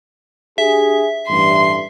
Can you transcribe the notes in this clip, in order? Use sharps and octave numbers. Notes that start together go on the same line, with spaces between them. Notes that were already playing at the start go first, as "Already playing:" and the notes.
D4 G4 G#4 E5
A1 G2 C6